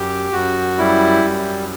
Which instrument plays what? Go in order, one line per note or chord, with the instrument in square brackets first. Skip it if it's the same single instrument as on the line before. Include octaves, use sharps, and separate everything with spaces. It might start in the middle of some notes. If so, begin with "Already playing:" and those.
Already playing: [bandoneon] F#2 G4
F#2 F#4
G3 E4
F#2